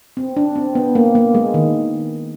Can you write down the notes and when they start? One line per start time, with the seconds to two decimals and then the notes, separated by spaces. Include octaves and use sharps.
0.17 C4
0.37 D4
0.56 C4
0.75 B3
0.95 A#3
1.15 A#3
1.35 G#3
1.54 D#3